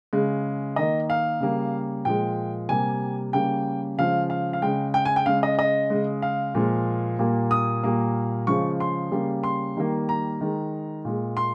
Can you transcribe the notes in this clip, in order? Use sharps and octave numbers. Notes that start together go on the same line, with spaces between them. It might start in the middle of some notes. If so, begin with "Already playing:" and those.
C#3 G#3
D#3 A#3 D#5
F5
C#3 G3 A#3
A#2 F3 G#3 G5
C3 G3 A#3 G#5
C#3 G3 A#3 G5
C#3 F3 G#3 F5
F5
F5
C#3 G#3 G5
G5
G#5
G5
C#3 G#3 F5
D#5
D#5
C#3 G#3
F5
A#2 F3 G#3
A#2 G3 A#3
D#6
A#2 G3 A#3
C#3 F3 G#3 C#6
C6
C#3 G3 A#3
C6
D#3 G3 A#3
A#5
D#3 G#3
A#2 G#3
C6